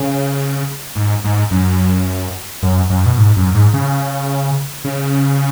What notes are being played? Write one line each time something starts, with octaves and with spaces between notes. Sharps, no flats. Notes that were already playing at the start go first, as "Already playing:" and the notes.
Already playing: C#3
G#2
G#2
F#2
F#2
F#2
B2
G#2
F#2
G#2
C#3
C#3